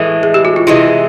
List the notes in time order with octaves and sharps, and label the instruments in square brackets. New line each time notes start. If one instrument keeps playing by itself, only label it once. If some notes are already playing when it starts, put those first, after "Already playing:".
Already playing: [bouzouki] A2 E3 G#3 [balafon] E4
[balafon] G#4
G4
F#4
F4
[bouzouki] C3 E3 G#3 [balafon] E4